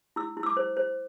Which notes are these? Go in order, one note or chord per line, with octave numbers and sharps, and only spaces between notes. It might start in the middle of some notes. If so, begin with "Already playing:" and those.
E4 E6
E4
E6
D6
C5
C5